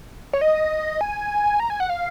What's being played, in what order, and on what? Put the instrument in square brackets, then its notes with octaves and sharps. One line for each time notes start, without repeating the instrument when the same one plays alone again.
[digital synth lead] C#5
D#5
G#5
A#5
G#5
F#5
F5